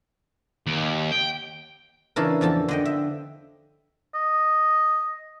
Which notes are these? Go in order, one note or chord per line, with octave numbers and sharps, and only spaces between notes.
D#2
G5
C#3 E3 D4 A4 A#4
E2 F3 A4 A5
D3 D#5 G5
E5
D#5